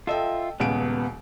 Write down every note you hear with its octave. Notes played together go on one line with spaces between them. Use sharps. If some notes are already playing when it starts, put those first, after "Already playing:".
F4 A4 D#5 E5 G5
D#1 C#2 B3 D7